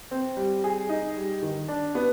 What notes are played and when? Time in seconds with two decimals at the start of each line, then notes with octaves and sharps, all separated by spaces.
0.11 C4
0.37 G3
0.64 G#4
0.89 D#4
1.17 G3
1.43 D#3
1.68 D4
1.95 B3